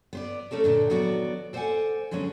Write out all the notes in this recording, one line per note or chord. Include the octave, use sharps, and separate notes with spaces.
B3 C5 D5
A3 C#4 A4 A#4
A#2 D3 D4
D#3 F#3 B3 F#4 A4 D5
A4 C5 D5 D#5 F#5 G#5
D3 F#3 G#3 A#3 C#4